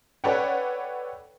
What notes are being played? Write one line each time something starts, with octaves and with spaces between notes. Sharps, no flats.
A4 B4 C#5 D5 F#5 G5